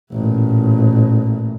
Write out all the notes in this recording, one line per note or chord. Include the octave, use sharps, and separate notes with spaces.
A1 A#2